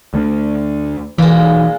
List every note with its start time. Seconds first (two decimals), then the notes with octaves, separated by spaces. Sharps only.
0.14 D2 A3 D4
1.18 B1 A#2 E3 G#3